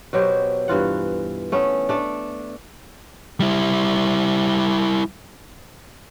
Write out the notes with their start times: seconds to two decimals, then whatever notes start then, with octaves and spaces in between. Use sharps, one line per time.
0.13 B2 F#3 G4 C5
0.68 G2 E3 F4 F#5
1.52 A3 B3 C#4
1.89 A3 D4
3.40 G3 E4